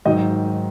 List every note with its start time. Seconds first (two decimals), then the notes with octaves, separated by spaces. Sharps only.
0.05 G#2 D#3 F#3 D#5